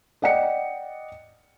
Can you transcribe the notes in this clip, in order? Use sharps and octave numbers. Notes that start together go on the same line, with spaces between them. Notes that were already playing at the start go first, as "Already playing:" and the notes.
D5 D#5 F#5 G5 C#7